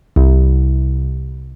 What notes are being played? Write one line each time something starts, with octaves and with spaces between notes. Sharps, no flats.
C2